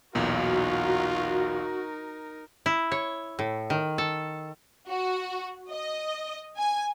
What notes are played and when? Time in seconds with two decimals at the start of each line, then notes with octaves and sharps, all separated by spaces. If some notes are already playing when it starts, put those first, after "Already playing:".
0.15 B1 E2 A#2 D#4 F4 F#4 A#4
2.66 E4
2.92 C#5
3.39 A2
3.70 D#3
3.98 A4
4.88 F#4
5.70 D#5
6.57 G#5